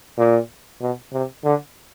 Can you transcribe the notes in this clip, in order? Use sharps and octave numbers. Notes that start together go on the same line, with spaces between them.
A#2
B2
C3
D3